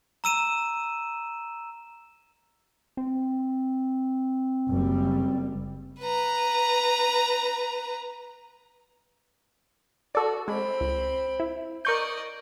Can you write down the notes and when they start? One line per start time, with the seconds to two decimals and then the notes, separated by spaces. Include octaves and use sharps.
0.24 A#5 E6 D#7 E7
2.97 C4
4.69 F#1 G3
6.01 B4 A#5
10.15 F#4 A4 D5
10.48 G#3 C4 B5
10.81 C#2
11.40 E4
11.85 A#4 D5 D#5 C#6 G6